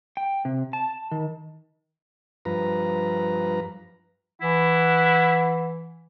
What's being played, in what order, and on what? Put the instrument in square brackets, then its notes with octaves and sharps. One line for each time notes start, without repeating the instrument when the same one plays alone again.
[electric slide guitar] G5
C3
A5
D#3
[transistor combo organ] G2 F3 B4 A#5
[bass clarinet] E3 [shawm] E4 [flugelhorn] F#5